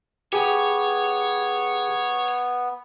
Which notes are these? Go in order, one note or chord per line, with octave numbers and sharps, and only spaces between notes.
B3 G4 G#4 C#5 G#5